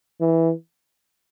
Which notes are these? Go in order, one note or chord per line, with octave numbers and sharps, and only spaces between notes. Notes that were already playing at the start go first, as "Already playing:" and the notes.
E3